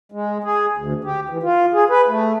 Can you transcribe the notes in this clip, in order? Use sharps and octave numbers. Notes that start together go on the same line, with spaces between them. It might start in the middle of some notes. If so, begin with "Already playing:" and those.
G#3
G#4
D2
G4
E3
F4
G#4
B4
A3